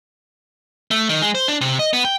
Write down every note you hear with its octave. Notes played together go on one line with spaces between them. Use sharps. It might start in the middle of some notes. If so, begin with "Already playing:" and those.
A3
D#3
G#3
C5
D4
C3
D#5
B3
G5